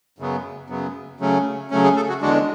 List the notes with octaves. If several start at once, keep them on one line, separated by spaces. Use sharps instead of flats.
F#2 C#3 F#3 B3
F#2 C#3 F#3 B3
C#3 F#3 A3 C#4
C#3 F#3 A3 C#4
G#4
A4
F#4
E2 D3 G#3 D4 F#4